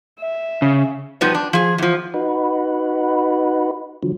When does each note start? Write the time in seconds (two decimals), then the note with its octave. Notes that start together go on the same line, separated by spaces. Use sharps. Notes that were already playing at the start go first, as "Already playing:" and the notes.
0.20 E5
0.62 C#3
1.21 B2 F3 G3 B3 D#4
1.34 D4
1.53 F3 G#4
1.78 E2 F3
2.14 D#4 F#4 B4
4.03 D3 F3 F#3